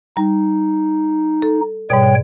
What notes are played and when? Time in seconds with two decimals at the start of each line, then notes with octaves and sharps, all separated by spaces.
0.17 G3 D#4
1.42 A4
1.90 G#2 B2 G3 C#5 G5